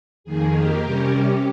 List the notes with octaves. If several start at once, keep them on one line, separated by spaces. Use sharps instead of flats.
F2 D#3 A#3 G#4
G4 A#4
C3 G3 C#4
G4